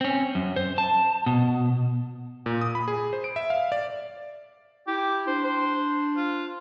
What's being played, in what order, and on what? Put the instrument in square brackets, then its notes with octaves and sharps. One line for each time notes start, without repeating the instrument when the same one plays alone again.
[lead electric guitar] C4 C#4
F#2
C5
A5
B2
[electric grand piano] A#2
D#6
B5
G#4
C5
D7
E5
F5
D5
[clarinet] E4 [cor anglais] G4
[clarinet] D4 [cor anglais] C5
[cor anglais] C5
F4